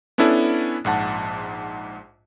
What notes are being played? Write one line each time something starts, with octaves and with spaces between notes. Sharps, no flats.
B3 C#4 D4 E4 A4
A#1 G#2 F#5 A5